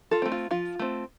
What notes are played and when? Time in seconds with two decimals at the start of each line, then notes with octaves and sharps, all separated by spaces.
0.11 F4 A4
0.22 A3 C4
0.32 F4
0.51 F3 F4
0.79 A3 C4